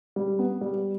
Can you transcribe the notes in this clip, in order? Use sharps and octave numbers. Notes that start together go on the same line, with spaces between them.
G3
B3
G3